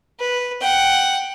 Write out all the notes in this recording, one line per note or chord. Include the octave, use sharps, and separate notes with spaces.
B4
F#5 G5